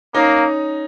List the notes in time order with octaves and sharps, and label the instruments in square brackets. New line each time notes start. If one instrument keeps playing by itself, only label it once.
[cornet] A#3 [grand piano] C#4 D#4